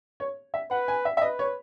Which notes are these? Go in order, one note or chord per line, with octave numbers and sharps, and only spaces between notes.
C#5
E5
B4 F#5
G#5
E5
E5
B4 D#5
C#5